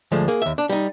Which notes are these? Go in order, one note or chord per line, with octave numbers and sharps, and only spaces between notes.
D2 F3 G#3 A3
A#3 G#4
D#2 E5
D4
G3 D#4